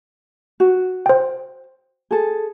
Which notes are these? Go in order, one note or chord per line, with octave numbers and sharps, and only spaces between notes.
F#4
C5 G5
G#4 A4